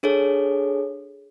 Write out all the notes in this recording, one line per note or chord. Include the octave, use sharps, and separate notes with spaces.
D4 G#4 A4 C#5